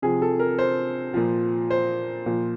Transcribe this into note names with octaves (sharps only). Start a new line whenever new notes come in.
C3 F3 G#4
A4
A#4
C5
A#2 F3
C5
A#2 F3